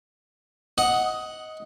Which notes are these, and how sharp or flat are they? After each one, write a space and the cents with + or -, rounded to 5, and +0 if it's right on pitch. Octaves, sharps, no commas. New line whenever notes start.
D#5 +15 F#5 +0 D#6 +0